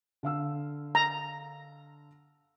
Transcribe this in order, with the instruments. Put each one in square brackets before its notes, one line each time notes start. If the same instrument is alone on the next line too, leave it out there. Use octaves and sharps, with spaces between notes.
[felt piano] D3 F5 E6
[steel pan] A#5